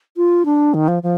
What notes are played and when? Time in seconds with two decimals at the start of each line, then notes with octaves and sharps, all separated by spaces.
0.17 F4
0.45 D4
0.74 D#3
0.88 F3
1.03 F3